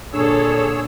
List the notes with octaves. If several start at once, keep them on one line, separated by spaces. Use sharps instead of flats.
A#2 D3 D4 G#4 A4 C#5 E6